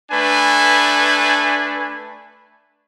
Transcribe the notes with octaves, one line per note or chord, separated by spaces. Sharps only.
A3 D4 B4 G#5